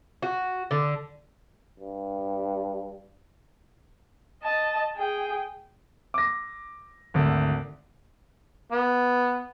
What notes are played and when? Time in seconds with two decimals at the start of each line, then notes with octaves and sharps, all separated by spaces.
0.22 F#4
0.71 D3
1.80 G2
4.42 D#5 A5
4.96 G#4 G5
6.14 D6 A#6
7.14 G#1 D2
8.72 B3